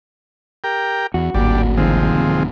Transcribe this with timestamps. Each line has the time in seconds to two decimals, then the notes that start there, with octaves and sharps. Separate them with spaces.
0.64 G4 A#4 G5
1.14 E2 F#4
1.34 D1 G#1 G3 A#3 D4
1.77 C3 D#3 F3 G#3 C4